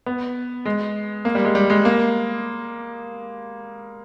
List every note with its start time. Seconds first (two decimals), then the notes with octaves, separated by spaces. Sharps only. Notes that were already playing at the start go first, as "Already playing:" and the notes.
0.06 B3
0.65 G#3
1.25 A#3
1.35 G3
1.45 G#3
1.55 G3
1.70 G#3
1.85 A#3